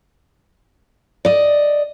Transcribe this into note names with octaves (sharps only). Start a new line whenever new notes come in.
D5 D#5